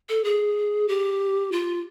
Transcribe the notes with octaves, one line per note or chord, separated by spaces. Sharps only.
A4
G#4
G4
F4